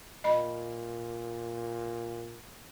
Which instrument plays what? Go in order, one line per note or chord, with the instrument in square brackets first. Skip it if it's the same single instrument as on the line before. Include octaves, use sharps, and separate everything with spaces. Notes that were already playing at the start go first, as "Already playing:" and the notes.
[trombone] A#2 [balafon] D#5 B5